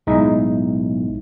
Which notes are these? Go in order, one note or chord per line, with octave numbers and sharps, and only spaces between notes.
B1 A2 G#3 D#4 E4